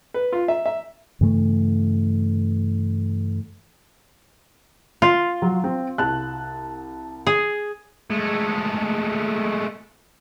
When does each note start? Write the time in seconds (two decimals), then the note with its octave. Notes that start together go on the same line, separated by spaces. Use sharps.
0.14 B4
0.32 F4
0.48 E5
0.66 E5
1.21 G2 C#3 E3 A3
5.02 F4
5.42 F#3
5.64 C4
5.98 C2 A5 F#6
7.27 G#4
8.10 G#3 A3